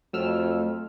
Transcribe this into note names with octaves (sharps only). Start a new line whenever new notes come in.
F2 F#3 A3 E6 F6